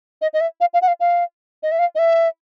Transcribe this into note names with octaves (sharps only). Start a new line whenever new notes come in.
D#5
D#5
E5
F5
F5
F#5
F5
F5
D#5
E5
F5
D#5
E5